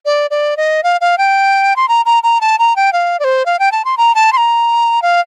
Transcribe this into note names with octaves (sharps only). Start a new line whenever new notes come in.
D5
D5
D#5
F5
F5
G5
C6
A#5
A#5
A#5
A5
A#5
G5
F5
D5
C5
F5
G5
A5
C6
A#5
A5
C6
A#5
F5